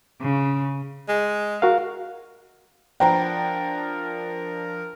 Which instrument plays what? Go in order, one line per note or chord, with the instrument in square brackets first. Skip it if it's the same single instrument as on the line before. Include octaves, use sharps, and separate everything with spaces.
[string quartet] C#3
[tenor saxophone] G#3
[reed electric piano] F#4 A#4 F5
[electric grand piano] F3 D4 [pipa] B3 C5 A#5 [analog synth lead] A#4 [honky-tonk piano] G5